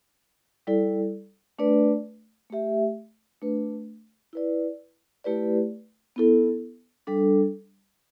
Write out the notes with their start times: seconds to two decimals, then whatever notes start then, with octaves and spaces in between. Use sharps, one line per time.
0.67 G3 E4 A4 D5
1.59 A3 D4 B4 D5
2.50 A3 G4 E5
3.42 A3 D4 B4
4.33 E4 B4 D5
5.24 A3 E4 G4 B4 D5
6.16 B3 E4 A4
7.07 G3 D4 A4